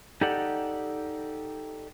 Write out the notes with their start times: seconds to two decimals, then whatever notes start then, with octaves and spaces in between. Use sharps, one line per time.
0.21 D#4 G4 A4 D5 F#5